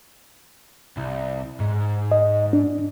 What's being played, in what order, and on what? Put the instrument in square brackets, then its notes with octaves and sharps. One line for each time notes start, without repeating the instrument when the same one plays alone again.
[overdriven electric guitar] C2
G#2
[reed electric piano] D#5
D4